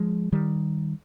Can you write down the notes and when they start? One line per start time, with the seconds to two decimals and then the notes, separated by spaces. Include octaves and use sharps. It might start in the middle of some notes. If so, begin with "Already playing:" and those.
Already playing: F3 G#3
0.32 D#3 G3